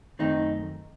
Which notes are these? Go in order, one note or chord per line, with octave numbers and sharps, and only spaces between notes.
F#2 D#3 A3 C4 D#4